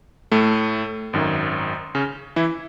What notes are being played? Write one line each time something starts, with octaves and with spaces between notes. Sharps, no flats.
A2 A3
G#1 F#2 D#3
C#3 C#4
E3 E4